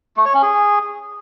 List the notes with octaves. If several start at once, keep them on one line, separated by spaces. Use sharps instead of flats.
A3
C#5
C#4
G#4